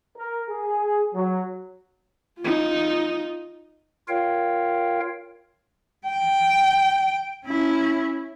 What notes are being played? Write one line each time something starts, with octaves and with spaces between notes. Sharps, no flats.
A#4
G#4
F#3
D#4 F4
F4 A#4 C#5 F5 G5
G5
C#4 E4